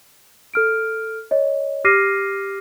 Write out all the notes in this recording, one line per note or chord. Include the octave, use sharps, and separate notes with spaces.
A4 F6 D7
C#5 D#5
G4 D6 F6 A#6 C7 D#7